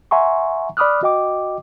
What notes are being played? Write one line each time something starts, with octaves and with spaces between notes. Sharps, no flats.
E5 F#5 G#5 A#5 C6 C#6
D5 B5 D6 D#6 F6 F#6
F#4 D#5 G5 D6